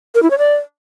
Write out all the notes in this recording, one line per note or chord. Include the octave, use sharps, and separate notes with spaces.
A#4
E4
C#5
D5